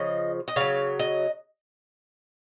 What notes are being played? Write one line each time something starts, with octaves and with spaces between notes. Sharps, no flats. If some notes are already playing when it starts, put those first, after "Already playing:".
Already playing: C#3 F3 D#5
D#5
C#3 F#3 F5
D#5